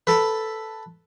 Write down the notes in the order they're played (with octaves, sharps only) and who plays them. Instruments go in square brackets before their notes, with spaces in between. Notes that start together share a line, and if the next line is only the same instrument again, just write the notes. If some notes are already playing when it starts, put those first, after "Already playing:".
[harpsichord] A4 B4